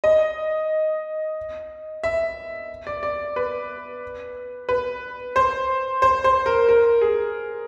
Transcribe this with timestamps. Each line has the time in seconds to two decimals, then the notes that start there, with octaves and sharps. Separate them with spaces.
0.04 D#5
2.03 E5
2.87 D5
3.03 D5
3.36 B4
4.69 B4
5.36 C5
6.02 C5
6.24 C5
6.46 A#4
6.69 A#4
7.01 G#4